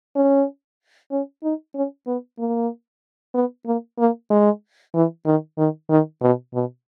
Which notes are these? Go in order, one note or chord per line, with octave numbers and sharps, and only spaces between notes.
C#4
C#4
D#4
C#4
B3
A#3
B3
A#3
A#3
G#3
E3
D#3
D#3
D#3
B2
B2